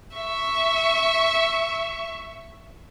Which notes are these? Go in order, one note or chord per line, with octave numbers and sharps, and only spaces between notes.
E5 C#6